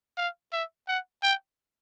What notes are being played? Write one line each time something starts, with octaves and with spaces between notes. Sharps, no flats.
F5
E5
F#5
G5